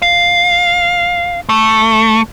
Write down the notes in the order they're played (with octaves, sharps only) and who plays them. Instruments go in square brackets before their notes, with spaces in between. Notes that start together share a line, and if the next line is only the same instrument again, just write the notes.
[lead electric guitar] F5
A3